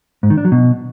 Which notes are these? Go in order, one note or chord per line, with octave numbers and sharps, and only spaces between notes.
G#2
D#3
D4
F#3
B2